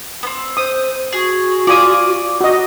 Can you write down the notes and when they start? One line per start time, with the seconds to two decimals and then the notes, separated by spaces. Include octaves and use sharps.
0.23 B3 C4
0.57 C5 D#6
1.13 F#4 G#4
1.67 F4 D5 G#5 D#6
2.41 F#4 D#5